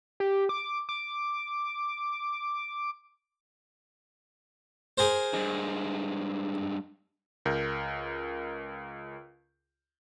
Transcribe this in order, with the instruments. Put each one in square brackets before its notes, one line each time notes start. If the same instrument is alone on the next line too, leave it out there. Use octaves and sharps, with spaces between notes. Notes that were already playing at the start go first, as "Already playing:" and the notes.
[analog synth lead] G4
D6
D6
[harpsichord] G#4 A#4 C5
[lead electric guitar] G2 G#3
[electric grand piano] C#2 A#4 G6